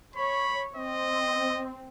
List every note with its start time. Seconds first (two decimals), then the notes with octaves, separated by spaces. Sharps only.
0.16 C#5 B5
0.76 C4 D#5